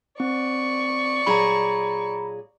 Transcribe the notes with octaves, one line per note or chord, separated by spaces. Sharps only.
C4 D5 C#6
A#2 F#3 G#4 A#5 B5